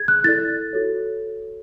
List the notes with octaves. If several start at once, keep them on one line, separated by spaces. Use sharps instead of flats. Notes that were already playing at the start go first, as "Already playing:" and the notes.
Already playing: G#4 G#6
F#6
E4 A4 D5 A6
F#4 A4 C#5